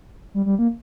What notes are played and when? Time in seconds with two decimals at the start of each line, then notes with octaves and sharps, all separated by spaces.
0.34 G3
0.46 G3
0.59 A#3